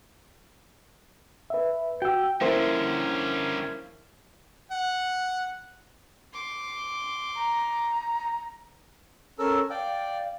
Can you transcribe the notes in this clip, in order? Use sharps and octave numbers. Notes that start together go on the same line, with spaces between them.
B4 E5
F#4 G5 E6
G2 D3 F3 A#3 C#4 E4 C5
F#5
C6 D6
A#5
C#4 A4 A#4 E6
D5 F5 G5